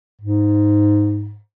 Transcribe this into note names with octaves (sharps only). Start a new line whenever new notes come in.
G#2